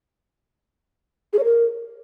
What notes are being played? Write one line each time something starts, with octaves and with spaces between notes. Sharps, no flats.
G#4
C#5
A#4